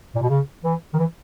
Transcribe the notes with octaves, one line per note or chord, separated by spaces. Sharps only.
A#2
B2
C#3
E3
D#3
E3